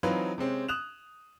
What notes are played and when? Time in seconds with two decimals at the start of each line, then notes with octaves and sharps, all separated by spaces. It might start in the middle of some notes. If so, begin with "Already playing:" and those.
0.03 E3 F#3 C4 D#4 F4 B4
0.38 C3 G#3 C4 C#4
0.68 D#6 F#6 E7 F7